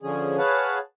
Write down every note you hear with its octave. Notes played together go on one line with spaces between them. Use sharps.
D3 F3 C#4 G#4
G#4 B4 C#5 F5 F#5 A5